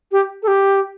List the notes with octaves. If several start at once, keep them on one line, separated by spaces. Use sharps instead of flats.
G4
A4
G4